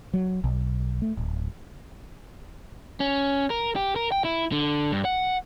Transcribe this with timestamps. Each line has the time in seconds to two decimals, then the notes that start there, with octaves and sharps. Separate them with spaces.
0.13 F#3
0.44 B1
1.02 A3
1.17 D1
3.00 C#4
3.50 A#4
3.76 G4
3.96 A#4
4.12 G5
4.25 E4
4.52 D3
4.92 G2
5.05 F#5